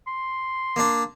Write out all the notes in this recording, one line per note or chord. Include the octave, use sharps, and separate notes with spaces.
C6
A#3 D4